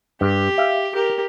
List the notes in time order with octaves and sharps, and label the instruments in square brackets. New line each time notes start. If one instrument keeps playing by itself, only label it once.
[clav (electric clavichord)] G2 [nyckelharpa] G4
[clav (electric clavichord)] E5 F5
[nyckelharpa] G4 A#4